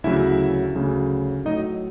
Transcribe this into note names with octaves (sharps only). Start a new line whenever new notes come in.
D2 C#3 F#3 E4 E5
D2 C#3 F#3
A2 F#3 D#4 D#5